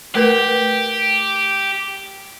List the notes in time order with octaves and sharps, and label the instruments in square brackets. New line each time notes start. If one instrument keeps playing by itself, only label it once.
[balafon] A3 A#4 B4 [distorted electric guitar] G4